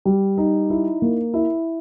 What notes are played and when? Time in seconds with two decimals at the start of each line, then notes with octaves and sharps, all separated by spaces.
0.05 G3
0.38 D#4
0.70 E4
1.02 A#3
1.34 E4